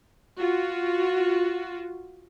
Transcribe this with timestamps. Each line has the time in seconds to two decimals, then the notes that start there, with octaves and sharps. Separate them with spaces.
0.38 F4 F#4